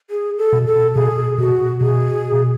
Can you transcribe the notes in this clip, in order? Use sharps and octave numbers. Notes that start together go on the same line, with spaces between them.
G#4
A4
B2
A4
B2 G#4
B2 F#4
B2 G#4